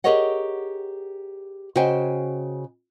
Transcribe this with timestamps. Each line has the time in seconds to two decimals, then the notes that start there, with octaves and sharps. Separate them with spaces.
0.04 G4 G#4 A#4 C#5 D#5 F#5
1.75 C#3 F#4 C5 D#5 G5 G#5